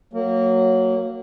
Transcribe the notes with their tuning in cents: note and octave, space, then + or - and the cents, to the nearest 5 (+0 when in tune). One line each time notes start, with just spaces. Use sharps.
F#3 +0 A#3 -20